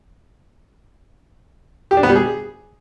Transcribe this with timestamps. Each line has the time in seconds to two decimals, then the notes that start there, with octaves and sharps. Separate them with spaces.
1.91 G4
1.97 D4
2.03 B3
2.09 G3
2.16 G#4